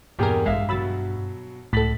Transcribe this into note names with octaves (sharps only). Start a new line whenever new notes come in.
E2 G2 A#2 G4 G#4 A#4
A1 G#3 E5 F5
B2 F#3 B5 E6 A6
C#2 A2 A4 A6 B6 F#7